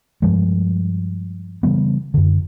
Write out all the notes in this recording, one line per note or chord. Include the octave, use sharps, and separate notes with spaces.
G2 F3 G#3
C#3 E3 G3 B3
F#2 D3